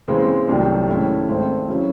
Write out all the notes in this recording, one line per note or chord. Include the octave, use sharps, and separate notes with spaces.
D#2 C#3 E3 G#3 C4
C2 C3 D#3 F#3 A3
G#2 D#3 A3 C#4 E4
G#1 G#2 D#3 A3 C4
C#3 F#3 C#4 E4